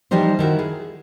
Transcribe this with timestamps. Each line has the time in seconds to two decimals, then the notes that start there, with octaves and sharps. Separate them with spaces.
0.11 E3 F3 G3 D#4 C5
0.39 D#3 E4 F#4
0.59 G#4